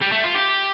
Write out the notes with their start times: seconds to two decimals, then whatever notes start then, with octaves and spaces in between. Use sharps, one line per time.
0.01 G3
0.12 A3
0.24 F4
0.35 G4